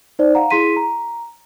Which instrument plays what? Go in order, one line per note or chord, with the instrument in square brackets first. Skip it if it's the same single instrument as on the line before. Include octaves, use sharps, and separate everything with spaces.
[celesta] D#4 C5 D5
F5 F#5 A#5
E4 G#4 C6 B6 D#7
A#5